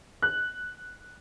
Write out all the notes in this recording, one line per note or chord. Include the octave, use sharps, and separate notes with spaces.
F#6